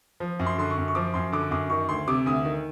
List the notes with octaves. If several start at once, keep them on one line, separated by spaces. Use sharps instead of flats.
F3
F#2
C6
D3 C6
C#6
F#2
C#6
F3 D6
F#2 C6
D3 D6
F#2 D6
D#3 C#6
D2 C6
C3 D6
D2 D#6
D#3